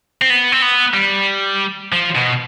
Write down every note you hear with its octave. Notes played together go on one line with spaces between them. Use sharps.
C4
B3
C4
B3
G3
F3
B2